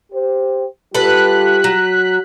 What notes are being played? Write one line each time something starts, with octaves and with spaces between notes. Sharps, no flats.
G4 C5
G3 F4 G4 A4 B4 F#6 B6
F#3